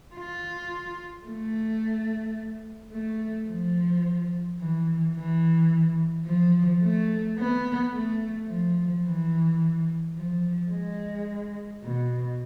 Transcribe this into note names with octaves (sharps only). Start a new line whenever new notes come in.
F4
A3
A3
F3
E3
E3
F3
A3
B3
A3
F3
E3
F3
G#3
B2